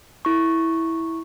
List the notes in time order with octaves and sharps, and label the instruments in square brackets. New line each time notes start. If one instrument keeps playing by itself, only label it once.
[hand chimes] E4 C#6